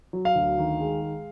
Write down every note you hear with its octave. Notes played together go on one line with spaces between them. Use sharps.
F#3
F5
D2
D#3
G#3
G#3